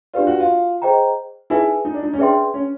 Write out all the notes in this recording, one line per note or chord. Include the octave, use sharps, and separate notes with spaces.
D4 F4 G4 B4 D5
F#4
F4
G#4 C5 D#5 G5 A#5
D#4 E4 G#4 B4 E5 G#5
D#4
D4
D#4
C#4
D4 G#4 B4 E5 G5 C6
C#4